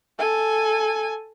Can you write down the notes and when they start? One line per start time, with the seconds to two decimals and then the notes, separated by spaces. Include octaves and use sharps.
0.19 A4 G#5